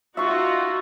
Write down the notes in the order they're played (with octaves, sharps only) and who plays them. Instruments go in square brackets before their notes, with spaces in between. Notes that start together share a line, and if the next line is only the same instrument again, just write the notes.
[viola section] D#4 F#4 [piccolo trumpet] F4 [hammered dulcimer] E5 C#6